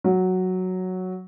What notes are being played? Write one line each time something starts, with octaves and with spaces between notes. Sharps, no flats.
F#3